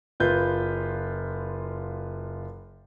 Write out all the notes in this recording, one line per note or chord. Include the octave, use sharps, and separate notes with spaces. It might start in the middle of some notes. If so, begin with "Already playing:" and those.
F#1 F4 B4 G6